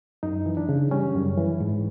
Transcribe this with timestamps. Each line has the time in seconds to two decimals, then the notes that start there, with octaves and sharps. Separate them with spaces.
0.23 F#2 D#4
0.46 E3
0.57 D4
0.69 C#3
0.91 G3 C#4
1.14 F#2
1.38 E3
1.60 G#2